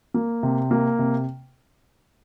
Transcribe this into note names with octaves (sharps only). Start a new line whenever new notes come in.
A#3
C3
A#3
C3